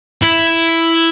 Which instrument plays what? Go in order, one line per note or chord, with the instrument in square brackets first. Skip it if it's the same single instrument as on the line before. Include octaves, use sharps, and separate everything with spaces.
[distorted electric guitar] E4